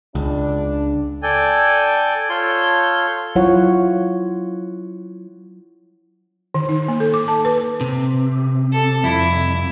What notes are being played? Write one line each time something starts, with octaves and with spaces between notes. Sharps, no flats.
C#2 D4
A4 D5 G5 G#5
F4 A4 C#5 C6 G6
F#3 E4 F4 C#5 F#5
D#3
D#4
A#3
A4
D6
A5
B4
C3
A4
C2 F2 E4